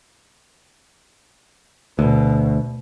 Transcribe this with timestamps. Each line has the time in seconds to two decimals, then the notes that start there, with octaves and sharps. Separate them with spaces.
1.99 D2 B2